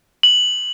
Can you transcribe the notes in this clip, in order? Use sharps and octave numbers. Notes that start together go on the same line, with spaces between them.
F#7